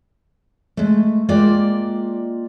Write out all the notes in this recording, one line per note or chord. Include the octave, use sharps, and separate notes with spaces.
G#3 A3
G#3 A#3 F4 D5 G5